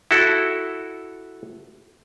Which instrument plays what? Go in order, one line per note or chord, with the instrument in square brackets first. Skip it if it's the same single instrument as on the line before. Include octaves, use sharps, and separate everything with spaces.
[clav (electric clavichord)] E4 F#4 A4